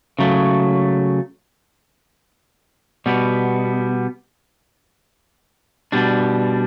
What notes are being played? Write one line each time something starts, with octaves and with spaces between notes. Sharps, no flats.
C#3 F#3 A3
B2 G3 B3
B2 G3 D4